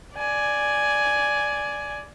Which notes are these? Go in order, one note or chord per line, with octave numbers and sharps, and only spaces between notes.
D5 G#5